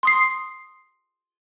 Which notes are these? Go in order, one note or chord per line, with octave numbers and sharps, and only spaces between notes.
C6 D#6 C7